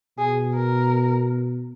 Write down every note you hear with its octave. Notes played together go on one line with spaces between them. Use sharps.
B2 G#4
A#4